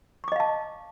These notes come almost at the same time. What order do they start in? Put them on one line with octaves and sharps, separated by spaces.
C#6 D6 D#5 F5 A5